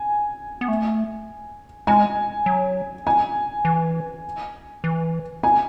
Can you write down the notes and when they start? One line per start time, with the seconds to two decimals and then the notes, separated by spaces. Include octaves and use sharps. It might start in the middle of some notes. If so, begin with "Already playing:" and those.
Already playing: G#5
0.61 B3
0.68 A3
1.87 G#3 G#5
2.46 F#3
3.07 G#5
3.65 E3
4.84 E3
5.43 G#5